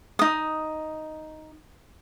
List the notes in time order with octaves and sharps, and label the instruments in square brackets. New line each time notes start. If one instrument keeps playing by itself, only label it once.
[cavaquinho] D#4 D#6